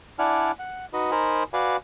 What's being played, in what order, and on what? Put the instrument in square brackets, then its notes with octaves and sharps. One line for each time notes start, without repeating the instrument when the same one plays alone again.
[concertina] D4 E4 D5 F#5 G#5 F6
F#5
D#4 F#4 B4 D#5
D#4 A#4 C5 G#5 B5
F#4 B4 D5 F5 G#5